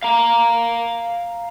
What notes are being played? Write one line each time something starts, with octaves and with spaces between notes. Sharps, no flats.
F5 A#5